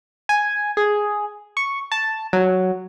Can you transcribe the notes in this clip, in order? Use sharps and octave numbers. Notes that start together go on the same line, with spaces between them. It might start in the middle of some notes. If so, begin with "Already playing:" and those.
G#5
G#4
C#6
A5
F#3